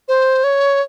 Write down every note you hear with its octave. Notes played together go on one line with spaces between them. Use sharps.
C5
C#5